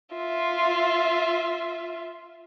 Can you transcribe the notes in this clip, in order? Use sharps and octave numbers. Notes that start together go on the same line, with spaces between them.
F4 E5